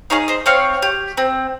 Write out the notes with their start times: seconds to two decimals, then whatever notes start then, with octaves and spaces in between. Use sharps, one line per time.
0.10 D#4 G#4 C#5 F5
0.28 C5 D#5
0.46 C4 C#5 F5
0.82 G4
1.17 C4